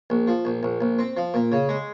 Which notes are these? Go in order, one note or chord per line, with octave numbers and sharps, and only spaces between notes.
A#1
F3
A#1
A#1
A#1
C4
F3
A#2
C#3
G#3